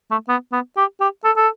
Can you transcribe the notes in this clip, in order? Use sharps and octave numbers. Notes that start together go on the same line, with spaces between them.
A3
B3
B3
G4
G4
A4
A4